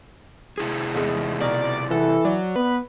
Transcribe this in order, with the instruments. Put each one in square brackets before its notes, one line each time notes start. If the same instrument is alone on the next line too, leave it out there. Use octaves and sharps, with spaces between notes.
[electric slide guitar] C3 E4 G#4
[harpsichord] E2 G#3
[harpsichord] B2 A#4 G#5 [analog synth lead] D5
[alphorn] E3 [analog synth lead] A4 [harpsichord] F#5
[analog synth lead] F#3 [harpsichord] D5
[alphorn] B3 [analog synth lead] B4